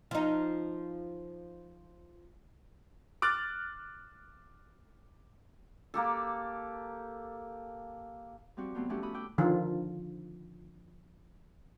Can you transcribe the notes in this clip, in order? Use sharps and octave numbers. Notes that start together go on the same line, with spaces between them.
F3 D#4
D6 F6 F#6 A6
A#3 G4 A4
F3 G3 C4 F#4 G4
C3 F#3 A3 B3 F4 C5
F3 A3 C#4 E4 F#4 G4
E4 F#4 B5 D#6
G5 D6 E6 F#6
D3 D#3 F3 F4